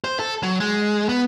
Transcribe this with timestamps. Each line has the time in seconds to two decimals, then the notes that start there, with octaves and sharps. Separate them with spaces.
0.04 C5
0.19 A4
0.43 F#3
0.60 G#3
1.09 B3